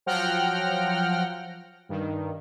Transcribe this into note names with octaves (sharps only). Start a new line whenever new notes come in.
F3 F#3 F#5 G5 F6 A#6
G2 D#3